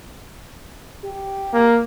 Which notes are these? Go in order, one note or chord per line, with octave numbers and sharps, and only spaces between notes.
G4
A#3